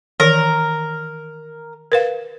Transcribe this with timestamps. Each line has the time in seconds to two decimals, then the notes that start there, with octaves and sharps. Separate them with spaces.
0.20 D#3 E3 A#4
1.92 A#4 B4 F5